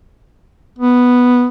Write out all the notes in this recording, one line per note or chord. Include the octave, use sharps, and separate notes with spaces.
B3